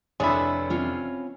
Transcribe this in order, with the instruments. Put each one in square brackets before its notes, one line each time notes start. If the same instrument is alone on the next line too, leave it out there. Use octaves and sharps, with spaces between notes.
[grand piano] F1 D4 B5 [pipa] G#3 E4 [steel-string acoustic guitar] A4 B4 C#5
[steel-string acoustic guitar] C4 C#4 F4